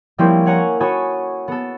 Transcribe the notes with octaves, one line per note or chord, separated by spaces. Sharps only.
F3 G3 A#3 C4 C#4 E4
A#4 C#5 F#5 G#5 A#5
F#4 A4 C#5 G#5 B5 D#6
B3 A4